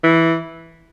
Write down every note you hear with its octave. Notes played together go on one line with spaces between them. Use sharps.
E3